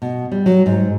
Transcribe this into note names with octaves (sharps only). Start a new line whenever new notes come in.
B2
G3
F#3
G#2